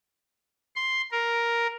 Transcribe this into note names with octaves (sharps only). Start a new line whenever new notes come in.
C6
A#4